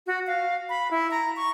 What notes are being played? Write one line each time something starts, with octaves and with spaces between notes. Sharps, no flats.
F#4
F5
B5
E4
A#5
C#6